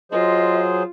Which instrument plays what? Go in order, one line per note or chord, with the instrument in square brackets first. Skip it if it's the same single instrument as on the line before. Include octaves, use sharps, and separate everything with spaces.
[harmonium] F#3 G#4 C5 [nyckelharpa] F4 [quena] D#5